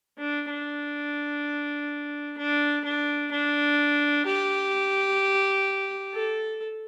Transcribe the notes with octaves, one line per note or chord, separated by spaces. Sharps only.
D4
D4
D4
D4
D4
G4
A4